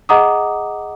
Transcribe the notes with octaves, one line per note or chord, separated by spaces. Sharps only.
G#4 D#5 F#5 A#5 D6 D#6